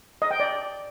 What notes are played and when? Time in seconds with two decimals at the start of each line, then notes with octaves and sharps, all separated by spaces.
0.22 D#5
0.31 G5
0.40 D5